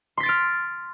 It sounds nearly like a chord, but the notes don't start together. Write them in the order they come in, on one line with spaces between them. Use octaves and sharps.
C6 B6 A6 D7 F6